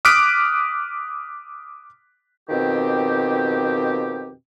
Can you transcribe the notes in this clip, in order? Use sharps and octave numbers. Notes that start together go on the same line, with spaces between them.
D6 D#6 F6 F#6 B6 D7
F2 B2 D#3 C4 G4